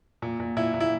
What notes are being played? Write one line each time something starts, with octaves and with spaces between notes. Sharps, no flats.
A#2
A#2
A#2 E4
A#2
E4